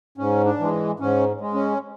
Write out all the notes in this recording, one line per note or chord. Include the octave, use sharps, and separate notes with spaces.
G#2 C#4
D4
E3 G#3
G#2 C#4
G#3
C#4